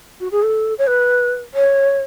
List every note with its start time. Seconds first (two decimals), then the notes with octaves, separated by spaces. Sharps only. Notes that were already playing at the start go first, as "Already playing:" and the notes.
0.20 F#4
0.32 G#4
0.43 A4
0.78 C#5
0.87 B4
1.54 C#5